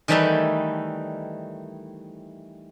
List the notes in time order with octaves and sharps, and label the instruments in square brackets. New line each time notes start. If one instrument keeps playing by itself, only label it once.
[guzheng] D#3 E3 G3 A3 D#4 E4